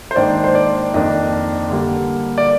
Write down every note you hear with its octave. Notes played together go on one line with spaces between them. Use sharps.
C5
G#2 D#3 A#3 D4 D5
C5
D5
F2 D#3 A#3 D4 D#5
D3 G3 A#3
D5